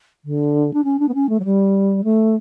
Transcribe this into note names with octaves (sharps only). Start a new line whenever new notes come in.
D3
D4
C#4
D4
B3
C#4
A3
F#3
G3
A3